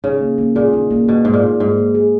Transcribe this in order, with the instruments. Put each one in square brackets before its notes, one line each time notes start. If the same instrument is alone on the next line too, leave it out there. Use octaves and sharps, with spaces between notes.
[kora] C#3 [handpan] D#4
[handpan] A#3
A#3
[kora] A#2 [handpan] G#4
[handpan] D#4
A#3
[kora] B2 [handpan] A#3
[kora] G#2 [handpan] G#4
[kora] A#2
[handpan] D#4
[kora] G#2 [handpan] A#3
[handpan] A#3
G#4